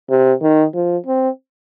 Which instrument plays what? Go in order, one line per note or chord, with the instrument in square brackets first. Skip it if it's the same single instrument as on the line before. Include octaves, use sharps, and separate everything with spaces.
[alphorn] C3
D#3
F3
C4